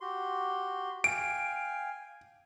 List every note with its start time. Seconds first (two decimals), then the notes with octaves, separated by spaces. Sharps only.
0.01 F#4 G4 C6
1.04 F5 G5 G#5 D7